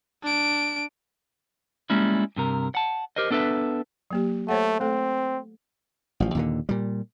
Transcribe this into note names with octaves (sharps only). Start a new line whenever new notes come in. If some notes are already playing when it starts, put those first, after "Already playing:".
D4 D7
G3 G#3 A#3 C#4 E4
G2 C3 A#4
F#5 A5
G4 A#4 C5 D#5
B3 D4 A4 B4 E5
F#3 A#3 G4
A3 C5 C#5 F#5
A3 C4 A4
A1 F3
D#2 A#2 D3
A#2 G3